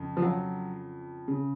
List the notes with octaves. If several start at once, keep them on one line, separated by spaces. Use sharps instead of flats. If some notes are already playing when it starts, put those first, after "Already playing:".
Already playing: F2 C#3
F3
F#3
C#3